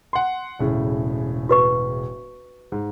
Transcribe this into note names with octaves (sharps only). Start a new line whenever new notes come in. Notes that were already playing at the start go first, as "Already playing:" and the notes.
F#5 C6
E1 A2 C#3
F#4 B4 C#6
G#2